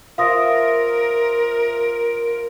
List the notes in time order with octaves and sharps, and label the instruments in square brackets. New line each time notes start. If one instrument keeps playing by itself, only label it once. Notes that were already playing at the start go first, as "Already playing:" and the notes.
[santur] F4 C5 E5 [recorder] A#4 [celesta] F5 D#6 A#6